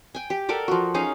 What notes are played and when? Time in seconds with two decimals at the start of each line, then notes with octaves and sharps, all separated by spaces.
0.15 G5 G#5
0.30 G4
0.49 A4 A#4 D5 F#5
0.68 F3 F#4
0.94 C#4 D#4 G#4 F5